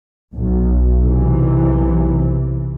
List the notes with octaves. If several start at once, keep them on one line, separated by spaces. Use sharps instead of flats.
B1
B1 C3 E3